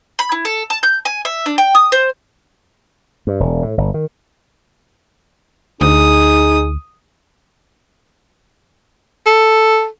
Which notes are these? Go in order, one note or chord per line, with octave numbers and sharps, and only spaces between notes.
B5
E4
A4
A5
G6
G#5
E5
D4
G5
D#6
C5
G2
E1
A2
G1
D#3
D2 D#4 G#4 D#6
A4